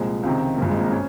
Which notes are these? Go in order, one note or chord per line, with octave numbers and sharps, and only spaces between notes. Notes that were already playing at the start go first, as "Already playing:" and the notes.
Already playing: C2 A#2 F3 G#3
C#2 C3 D#3
G#1 G2 F3 A#3
G#3
A#3
C#4